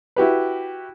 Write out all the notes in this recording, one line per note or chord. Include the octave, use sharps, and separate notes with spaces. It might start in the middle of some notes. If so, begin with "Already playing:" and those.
E4 F#4 G4 B4